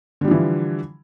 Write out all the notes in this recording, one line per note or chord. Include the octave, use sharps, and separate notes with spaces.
D3 E3 F3 G3